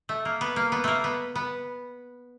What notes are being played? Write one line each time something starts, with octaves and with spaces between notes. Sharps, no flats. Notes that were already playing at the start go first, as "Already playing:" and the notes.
A3
A#3
B3
A#3
B3
A3 A#3
B3
B3